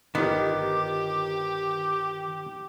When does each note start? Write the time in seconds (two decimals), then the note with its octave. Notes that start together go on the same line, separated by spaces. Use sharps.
0.15 G1 D#3 B3 G4 D6